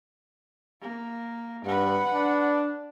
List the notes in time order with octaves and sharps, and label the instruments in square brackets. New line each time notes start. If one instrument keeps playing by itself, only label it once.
[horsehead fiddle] A#3
[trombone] G2 [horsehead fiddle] B4 F#5
[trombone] D4